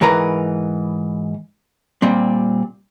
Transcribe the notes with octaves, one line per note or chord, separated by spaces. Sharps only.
G#2 E3 A#4 B4 A#5
A#2 G3 C4